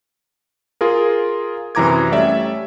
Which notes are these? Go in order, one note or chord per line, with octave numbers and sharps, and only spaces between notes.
F4 G#4 A#4
F#2 C3 E3 A#5 D6 G#6
G3 A3 C#4 D5 E5